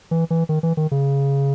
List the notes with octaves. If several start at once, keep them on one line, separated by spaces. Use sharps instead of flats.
E3
E3
D#3
E3
D#3
C#3